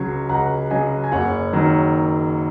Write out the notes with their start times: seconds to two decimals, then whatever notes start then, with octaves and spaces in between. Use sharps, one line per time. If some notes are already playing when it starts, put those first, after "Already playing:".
Already playing: C#2 C#3 F#3 C#5
0.29 C#2 F#5 A#5
0.71 C#3 F#3 D#5 G#5
1.04 G#5
1.12 F#1 C#5 F#5
1.53 D#3 F#3